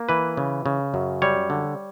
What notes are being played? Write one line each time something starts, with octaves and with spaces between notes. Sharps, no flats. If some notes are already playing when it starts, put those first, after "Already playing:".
Already playing: A#3
E3 B4
C#3
C#3
F#2
G3 C#5
D3